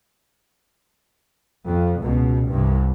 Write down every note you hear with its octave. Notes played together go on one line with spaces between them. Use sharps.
F2
C#2 B2
C2 G2